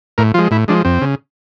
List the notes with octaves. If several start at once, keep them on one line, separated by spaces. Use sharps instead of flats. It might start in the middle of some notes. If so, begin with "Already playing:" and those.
A2 A#4
F3 G#3 F4
A2 E4
F3 G#3 D4
F2 C4
C#3